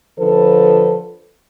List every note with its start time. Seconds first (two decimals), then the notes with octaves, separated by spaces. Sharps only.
0.19 D3 F3 A4 B4